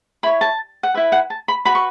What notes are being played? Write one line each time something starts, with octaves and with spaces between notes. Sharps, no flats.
E4 C#5 B5
A5
F#5
E4 B4 E5
F#5
A5
B5
F#4 B4 B5
C#6